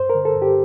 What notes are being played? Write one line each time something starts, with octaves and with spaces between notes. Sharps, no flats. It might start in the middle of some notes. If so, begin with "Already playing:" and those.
Already playing: G2 C5
A#4
D3
A4
G2
G4